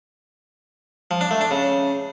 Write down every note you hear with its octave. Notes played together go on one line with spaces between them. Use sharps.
F3
D4
A3
D4
C#3